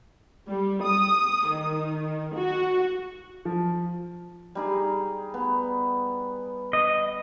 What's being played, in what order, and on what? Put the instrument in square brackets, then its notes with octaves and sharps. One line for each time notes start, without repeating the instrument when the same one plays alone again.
[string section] G3
D#6
D#3
F#4
[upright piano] F3
[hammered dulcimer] G3 D#4 G#4
B3
[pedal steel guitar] D#5